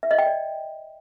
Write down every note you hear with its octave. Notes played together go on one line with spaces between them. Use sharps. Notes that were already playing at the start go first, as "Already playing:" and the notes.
E5
D#5
G5
D5